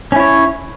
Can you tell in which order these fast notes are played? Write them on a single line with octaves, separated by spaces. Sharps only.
C#4 E4 C#5